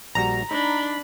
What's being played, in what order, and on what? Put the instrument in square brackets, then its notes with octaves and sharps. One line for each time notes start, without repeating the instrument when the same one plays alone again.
[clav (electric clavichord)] A#1 G3 F#4 [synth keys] A#5
[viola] D4 [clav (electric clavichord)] D#4 [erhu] B5